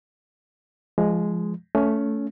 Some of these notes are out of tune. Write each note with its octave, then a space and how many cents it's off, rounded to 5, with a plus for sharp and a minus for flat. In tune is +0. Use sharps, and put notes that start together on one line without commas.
F3 -20 G#3 +0
A3 +0 C#4 +15